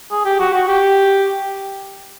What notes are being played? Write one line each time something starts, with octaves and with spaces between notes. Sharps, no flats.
G#4
G4
F#4
F#4
G4